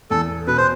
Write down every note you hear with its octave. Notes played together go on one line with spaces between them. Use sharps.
E2 A4
B2 B4
C5